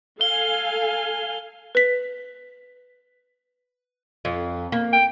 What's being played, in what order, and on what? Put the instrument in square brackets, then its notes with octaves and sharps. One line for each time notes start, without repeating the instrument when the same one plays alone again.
[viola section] A4 F5 G#5 [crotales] G7
[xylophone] B4 B6
[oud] F2
A#3
[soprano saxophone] G5